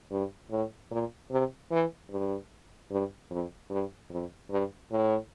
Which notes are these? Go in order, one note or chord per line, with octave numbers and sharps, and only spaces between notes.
G2
A2
A#2
C3
E3
G2
G2
F2
G2
F2
G2
A2